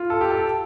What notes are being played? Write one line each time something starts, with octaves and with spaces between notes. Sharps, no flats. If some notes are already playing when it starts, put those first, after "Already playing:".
Already playing: F4
A4
G4
A4